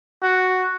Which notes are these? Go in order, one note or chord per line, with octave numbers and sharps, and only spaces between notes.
F#4